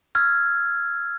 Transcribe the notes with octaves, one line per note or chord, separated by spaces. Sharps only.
E6 F6 G#6